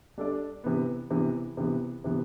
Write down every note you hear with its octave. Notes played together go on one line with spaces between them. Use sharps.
G3 D4 A4 D5
C3 E3 B3
C3 E3 B3
C3 E3 B3
C3 E3 B3